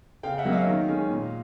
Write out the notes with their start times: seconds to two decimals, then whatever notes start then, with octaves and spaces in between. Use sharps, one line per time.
0.23 C#3 F5 G5
0.38 E5 F#5
0.45 F#3 A#3 C#4
0.52 D#5 F5
0.67 D#3
0.88 G#3 C#4
1.10 A#2